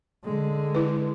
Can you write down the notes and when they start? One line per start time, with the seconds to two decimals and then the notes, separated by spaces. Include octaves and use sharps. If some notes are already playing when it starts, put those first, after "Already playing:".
0.24 D3 G#3
0.75 E4 B4